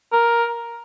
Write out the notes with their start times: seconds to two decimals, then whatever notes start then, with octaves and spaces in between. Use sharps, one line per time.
0.13 A#4